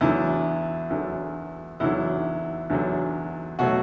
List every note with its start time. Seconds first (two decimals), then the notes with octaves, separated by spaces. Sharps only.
0.01 E2 D3 F#3 E4
0.90 E2 D3 F#3
1.80 E2 D3 F#3 E4
2.70 E2 D3 F#3
3.59 B2 F#3 A3 F#4